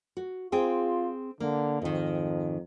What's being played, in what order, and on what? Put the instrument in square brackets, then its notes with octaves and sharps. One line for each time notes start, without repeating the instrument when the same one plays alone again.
[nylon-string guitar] F#4
[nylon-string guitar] C4 G#4 G5 [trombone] F4
[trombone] D3 [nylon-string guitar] A#3
[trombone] F2 [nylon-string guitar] G#2 D#3